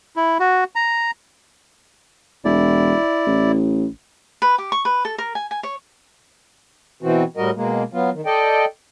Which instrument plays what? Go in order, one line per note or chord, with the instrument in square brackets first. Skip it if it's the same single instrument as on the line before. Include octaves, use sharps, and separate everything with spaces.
[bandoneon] E4
F#4
A#5
[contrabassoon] E1 [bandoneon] E4 D5
[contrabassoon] A1
[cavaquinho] B4
G4
C#6
B4
A4
A#4
G#5
G#5
C#5
[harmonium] B2 E3 C4 F#4
A2 G3 F#4 A#4 D#5
B2 G#3 A#3
F#3 B3 F4
D#3
A4 D5 D#5 G5